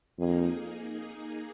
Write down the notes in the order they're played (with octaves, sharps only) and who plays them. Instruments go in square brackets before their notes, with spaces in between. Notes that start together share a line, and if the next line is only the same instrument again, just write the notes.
[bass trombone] F2 [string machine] A#3 D#4 G#4